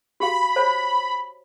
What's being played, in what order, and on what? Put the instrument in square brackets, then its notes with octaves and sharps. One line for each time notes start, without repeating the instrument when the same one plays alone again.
[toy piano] F#4 G4 F5 [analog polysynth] B5
[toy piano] C5 C#5 A5